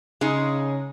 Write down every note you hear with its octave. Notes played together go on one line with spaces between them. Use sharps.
C#3 G#3 D#4